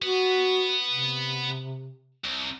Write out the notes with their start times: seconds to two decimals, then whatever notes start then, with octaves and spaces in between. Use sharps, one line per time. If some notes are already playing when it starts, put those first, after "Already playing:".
0.02 B3 F#4
0.88 C3
2.25 C2